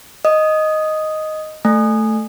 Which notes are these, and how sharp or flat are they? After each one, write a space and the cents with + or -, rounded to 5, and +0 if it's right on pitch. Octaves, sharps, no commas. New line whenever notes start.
D#5 +0 D#6 +0
A3 +0 G#5 +0